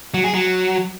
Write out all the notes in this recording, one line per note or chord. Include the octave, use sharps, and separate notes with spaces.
F#3
G#4
F#3